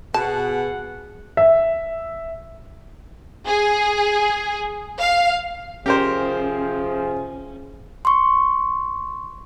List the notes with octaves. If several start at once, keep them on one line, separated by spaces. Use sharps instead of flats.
B2 G#4 F#5 A5
E5
G#4
F5
C3 F3 C#4 G4 G#4 A#4 C5
C6 C#6